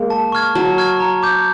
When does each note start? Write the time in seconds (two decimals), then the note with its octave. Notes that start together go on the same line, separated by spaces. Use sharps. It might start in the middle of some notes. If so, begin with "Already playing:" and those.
Already playing: G#3 A#3
0.10 A5
0.32 C#6 F6 G#6
0.55 F#3 A5
0.78 C#6 F6 G#6
1.00 A#5
1.23 D6 G6